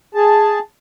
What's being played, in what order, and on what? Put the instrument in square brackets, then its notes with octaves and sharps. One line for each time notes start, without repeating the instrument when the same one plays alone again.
[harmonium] G#4 A5